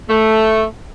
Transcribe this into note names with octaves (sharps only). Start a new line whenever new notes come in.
A3